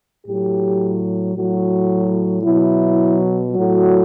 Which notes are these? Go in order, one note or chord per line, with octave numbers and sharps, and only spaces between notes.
A2 F#3 G4
A2 F#3 F#4
B2 F#3 E4
A2 F#3 F#4